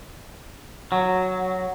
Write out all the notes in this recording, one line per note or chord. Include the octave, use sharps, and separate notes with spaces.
F#3